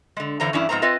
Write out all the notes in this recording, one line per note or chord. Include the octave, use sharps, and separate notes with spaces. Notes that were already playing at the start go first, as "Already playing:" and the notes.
D3 G#3
F2 D3 E3 C5 A#5
G2 E3 C#4 D4 E4
G#2 F3 B3 C4 A#5
C4 F4 B4 D#5 E5